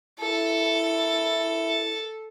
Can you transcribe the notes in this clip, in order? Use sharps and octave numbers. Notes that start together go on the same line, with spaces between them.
E4 A4